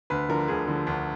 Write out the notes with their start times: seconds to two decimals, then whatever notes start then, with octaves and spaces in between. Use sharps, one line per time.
0.10 D2 B4
0.29 D3 F3 A#4
0.48 D2 G#4
0.67 D3 F3
0.87 D2